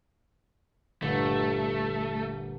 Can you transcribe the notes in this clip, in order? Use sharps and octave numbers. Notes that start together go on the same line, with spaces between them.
G1 A#2 A3